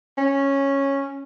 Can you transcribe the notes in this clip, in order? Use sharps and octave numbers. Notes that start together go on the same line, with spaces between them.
C#4